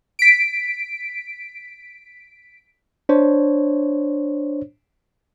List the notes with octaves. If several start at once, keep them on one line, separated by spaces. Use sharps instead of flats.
B6 D7
D4 C5 C#5